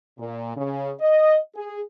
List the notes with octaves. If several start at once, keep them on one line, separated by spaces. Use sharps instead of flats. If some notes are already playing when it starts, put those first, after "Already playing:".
A#2
C#3
D#5
G#4